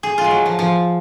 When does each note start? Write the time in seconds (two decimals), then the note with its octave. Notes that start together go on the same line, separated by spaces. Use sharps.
0.03 G#4
0.18 F4
0.24 G#3
0.31 F#3
0.46 F3
0.59 F3